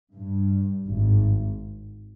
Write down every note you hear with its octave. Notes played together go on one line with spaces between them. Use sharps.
G2
G#1 G#2